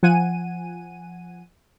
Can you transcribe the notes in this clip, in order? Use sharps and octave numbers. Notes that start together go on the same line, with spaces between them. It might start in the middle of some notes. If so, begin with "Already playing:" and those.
F3 F#5 G#5 D#7